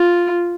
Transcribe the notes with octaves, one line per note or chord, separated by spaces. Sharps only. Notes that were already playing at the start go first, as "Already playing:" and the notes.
Already playing: F4